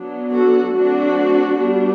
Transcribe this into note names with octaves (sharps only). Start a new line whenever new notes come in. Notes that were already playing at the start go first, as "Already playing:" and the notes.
Already playing: F#3 B3 D4
F#4 A4
F#3 A3 C4 D4 F#4
G3 B3 D4